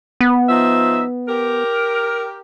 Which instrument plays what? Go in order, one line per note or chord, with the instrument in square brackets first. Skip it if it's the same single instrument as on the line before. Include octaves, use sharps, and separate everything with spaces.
[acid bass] B3
[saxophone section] F3 D#4 E5
G4 A#4